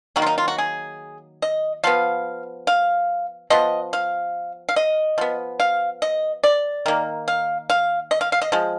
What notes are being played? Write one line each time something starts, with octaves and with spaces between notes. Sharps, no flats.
D#3 F#3 A#3 F#4
F4
D#4
F4
F#4
G#4
D#5
F3 B3 F5
F5
F3 B3 D#5
F5
F5
D#5
F3 B3
F5
D#5
D5
D#3 A#3
F5
F5
D#5
F5
F5
D#5
F3 G#3